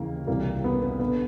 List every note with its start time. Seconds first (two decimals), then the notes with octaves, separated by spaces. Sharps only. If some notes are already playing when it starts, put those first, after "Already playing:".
Already playing: D#2 C#3 E3 A#3
0.27 C2 C3 E3 A#3
0.64 B3
0.82 B3
1.00 D3 B3